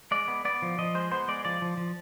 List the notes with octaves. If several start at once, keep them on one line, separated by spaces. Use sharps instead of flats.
G#3 D5
B3
B3 D5
F3
F3 D#5
G#3 C5
B3 C5
G#3 D5
F3 D5
F3
F3